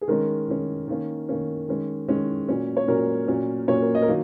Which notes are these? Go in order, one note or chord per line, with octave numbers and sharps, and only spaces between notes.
G#4
D#3 G#3 C#4 A#4
D#3 G#3 C#4
D#3 A#3 C#4
D#3 A#3 C#4
D#3 G#3 C#4
D#3 G#3 C#4
A#2 F#3 C#4
C#5
A#2 F#3 C#4 A#4
A#2 F#3 C#4
A#2 F#3 C#4 C#5
A#4
D#5
A#4
D#3 F#3 A#3